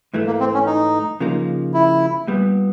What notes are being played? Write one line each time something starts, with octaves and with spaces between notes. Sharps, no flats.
G#2 E3 A3
A#3
C4
C#4
D#4
C#3 F3 A#3 D#4
E4
A#2 G3 B3